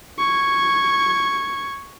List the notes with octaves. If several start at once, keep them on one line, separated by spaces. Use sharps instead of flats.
C#6 G#6